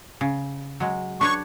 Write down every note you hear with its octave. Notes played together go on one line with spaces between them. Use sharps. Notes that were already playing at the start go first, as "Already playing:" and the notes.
C#3
F#3 G#3
D4 B4 C#5 C#6